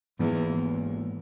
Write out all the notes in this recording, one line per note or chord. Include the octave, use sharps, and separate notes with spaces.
G#1 E2 G#2 F3 A#3